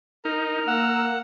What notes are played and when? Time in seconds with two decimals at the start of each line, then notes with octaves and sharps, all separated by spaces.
0.25 D#4 A#4
0.68 A#3 F#5 E6